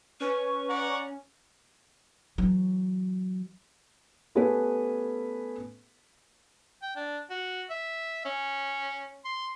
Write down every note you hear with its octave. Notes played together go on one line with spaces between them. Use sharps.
C#4 B4 C#6
D5 F#5 A#5
E3 F#3
A3 B3 C#4 G4 A4 B4
G5
D4
F#4
E5
C#4
C6